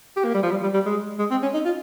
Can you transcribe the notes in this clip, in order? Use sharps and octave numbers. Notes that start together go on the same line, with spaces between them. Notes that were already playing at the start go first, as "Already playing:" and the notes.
G4
A#3
G3
F3
G3
G3
G3
G#3
G#3
C4
C#4
D#4
F4